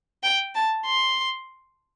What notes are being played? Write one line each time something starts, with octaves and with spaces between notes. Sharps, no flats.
G5
A5
C6